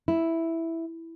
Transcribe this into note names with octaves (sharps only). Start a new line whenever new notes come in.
E4